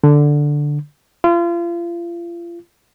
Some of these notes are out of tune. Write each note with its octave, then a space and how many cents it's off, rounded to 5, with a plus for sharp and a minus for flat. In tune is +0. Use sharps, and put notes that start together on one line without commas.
D3 +0
F4 -35